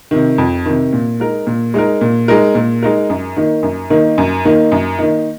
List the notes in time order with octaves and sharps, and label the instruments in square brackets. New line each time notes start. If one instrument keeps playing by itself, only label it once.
[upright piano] C3 D#3
F2
C3 D#3
A#2
G#3 D#4 A#4
A#2
G#3 D#4 A#4
A#2
G#3 D#4 A#4
A#2
G#3 D#4 A#4
F#2
D#3 A#3 D#4
F#2
D#3 A#3 D#4
F#2
D#3 A#3 D#4
F#2
D#3 A#3 D#4